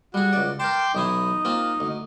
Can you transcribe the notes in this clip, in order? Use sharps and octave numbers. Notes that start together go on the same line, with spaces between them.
G3 F#4 G#4
C#2 D5
A#4 G5 A5 C6 D6
B1 E3 D#4 E4
A#3 C4 F4
D2